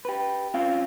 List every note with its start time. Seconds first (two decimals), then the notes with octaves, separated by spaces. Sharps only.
0.05 G4 B4
0.54 C4 C#4 F4 F5